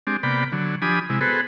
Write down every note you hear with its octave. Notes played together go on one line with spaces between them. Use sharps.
G#3 C4 D4 G4
C3 A#3 B3 D5 G5 B5
D3 F#3
F3 D4 G4 G#5 B5 D#6
C3 G#3 E4
B3 F#4 G#4 A4 B4 C5